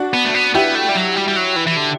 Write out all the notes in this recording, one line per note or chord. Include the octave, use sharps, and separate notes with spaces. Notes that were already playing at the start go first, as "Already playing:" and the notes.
Already playing: D4 F#4
B3
A3
B3
B3 E4 G4
A3
G3
F#3
G3
G3
F#3
E3
E3
D3